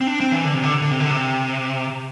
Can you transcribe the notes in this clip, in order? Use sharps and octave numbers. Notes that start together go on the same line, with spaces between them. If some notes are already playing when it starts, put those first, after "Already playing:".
C4
D4
C4
E3
D3
C3
D3
D3
C3
D3
C3